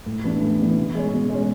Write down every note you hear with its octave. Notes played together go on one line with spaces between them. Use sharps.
A2
E3 B3 D4
A2
E3 B3 D4
B2
G#3 C#4
B2
G#3 C#4